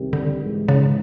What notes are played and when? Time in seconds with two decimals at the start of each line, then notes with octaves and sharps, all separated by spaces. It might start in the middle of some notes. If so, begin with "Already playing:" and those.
Already playing: C2 C3 D#3 G3
0.13 D3
0.41 G#2 E3 G#3
0.69 C#3